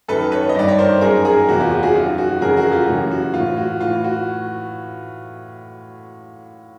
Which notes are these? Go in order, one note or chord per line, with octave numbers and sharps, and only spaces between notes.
F#2 D#3 A4 B4
B4 C#5
D#5
G2 D#3 D5
C#5
A#4 C5
F#2 D#3 G#4 A#4
G#4 A#4
E2 C3 E3 F#4
F4 G4
F4 G4
F#4 G#4
F#2 D#3 F4
F#4
F2 C#3 E3 G#4 A#4
F#4 G#4
F4 G4
F#2 C#3 E3
F#4
A2 E3 F4
F#4
A2 E3 F4
F#4